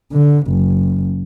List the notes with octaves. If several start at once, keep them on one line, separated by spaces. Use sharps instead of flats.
D3
F#1